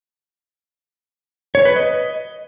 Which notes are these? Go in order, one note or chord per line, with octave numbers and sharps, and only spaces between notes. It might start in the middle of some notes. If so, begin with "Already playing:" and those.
C#5
B4
D#5